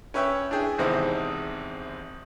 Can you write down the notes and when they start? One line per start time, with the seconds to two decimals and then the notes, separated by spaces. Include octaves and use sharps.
0.14 C#4 B4 C#5 E5 G5
0.51 D4 E4 G#4 G5
0.78 G#1 E2 C3 C4 D#4 E4